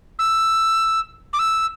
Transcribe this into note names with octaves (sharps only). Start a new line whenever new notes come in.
E6
D6
E6